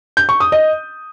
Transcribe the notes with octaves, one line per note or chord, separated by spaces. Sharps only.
G6
C#6
D#6
D#5